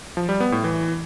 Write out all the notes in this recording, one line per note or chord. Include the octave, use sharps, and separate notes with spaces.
F3
G3
B3
A2
E3